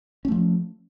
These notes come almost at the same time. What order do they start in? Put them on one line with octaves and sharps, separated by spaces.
C#4 A3 F3